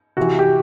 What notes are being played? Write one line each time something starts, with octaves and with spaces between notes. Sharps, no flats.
C3 E3 F#4
G4